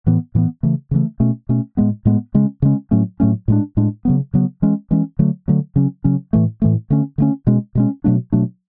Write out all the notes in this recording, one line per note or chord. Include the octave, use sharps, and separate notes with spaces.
A2 E3 B3
A2 E3 B3
C#3 E3 A3
C#3 E3 A3
B2 A3 C#4
B2 A3 C#4
A2 G#3 B3
A2 G#3 B3
C#3 G#3 C#4
C#3 G#3 C#4
A2 F#3 A3 C#4
A2 F#3 A3 C#4
A2 G#3 D4
A2 G#3 D4
C#3 F#3 B3
C#3 F#3 B3
E3 G#3 C#4
E3 G#3 C#4
D3 F#3 A3
D3 F#3 A3
C#3 F#3 C#4
C#3 F#3 C#4
A2 E3 A3
A2 E3 A3
D3 A3 C#4
D3 A3 C#4
B2 G#3 C#4
B2 G#3 C#4
B2 F#3 A3 D4
B2 F#3 A3 D4